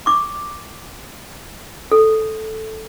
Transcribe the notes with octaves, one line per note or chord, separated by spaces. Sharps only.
C#6 D6
A4